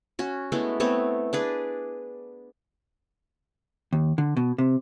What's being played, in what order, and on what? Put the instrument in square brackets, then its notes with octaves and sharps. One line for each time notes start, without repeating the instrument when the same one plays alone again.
[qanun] C#4 F#4
G#3 A3 B3 E4
A3 B3 C4 C#5
D4 G#4 B4
[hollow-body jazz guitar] D#2
D3
B2
C3